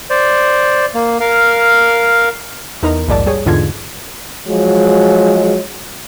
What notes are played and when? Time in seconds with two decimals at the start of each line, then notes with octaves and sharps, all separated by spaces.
0.10 C5 D5
0.95 A#3
1.20 A#4 F5
2.83 E2 D#4 A#4 A#5
3.08 A#1 D#2 G#2 D5 A5
3.26 G3 G#4 C#5
3.46 E2 G#2 D3 F4 G#6
4.48 F3 F#3 G#3